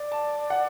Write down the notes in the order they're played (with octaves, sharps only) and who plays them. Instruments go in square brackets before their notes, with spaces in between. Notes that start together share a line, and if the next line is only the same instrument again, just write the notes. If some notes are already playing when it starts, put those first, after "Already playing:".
Already playing: [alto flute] D5
[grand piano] A5
F#5